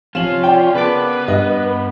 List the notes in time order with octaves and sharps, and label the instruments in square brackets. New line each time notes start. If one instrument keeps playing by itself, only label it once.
[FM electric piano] C3 F3 [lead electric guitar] C#4 [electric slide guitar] F4 [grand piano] E7 F#7
[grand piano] D5 G5
[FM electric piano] C#3 A5 D6 [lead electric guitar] A#3 B3 [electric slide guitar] B4
[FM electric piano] G2 [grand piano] D#5